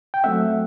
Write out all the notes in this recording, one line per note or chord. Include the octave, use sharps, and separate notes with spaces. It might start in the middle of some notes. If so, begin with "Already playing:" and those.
G5
F#3 A3 C4 E5 F#5